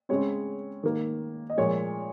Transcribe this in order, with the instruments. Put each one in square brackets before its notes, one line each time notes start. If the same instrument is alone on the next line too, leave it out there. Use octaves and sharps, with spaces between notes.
[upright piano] C#3 G#3 C4 C#5
D#3 A#3
D#5
A#2 F3 G#3 C#5